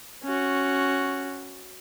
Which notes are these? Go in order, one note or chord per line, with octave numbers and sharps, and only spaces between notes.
C#4 F#4